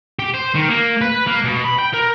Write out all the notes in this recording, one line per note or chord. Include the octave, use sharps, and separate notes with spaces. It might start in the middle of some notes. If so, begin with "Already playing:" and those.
G4
C5
D#3
A#3
B4
A#3
B2
B5
G5
A#4